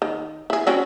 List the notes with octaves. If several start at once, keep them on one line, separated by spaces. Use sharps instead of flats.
D#3
E4 G#4
C4 C#4 F#4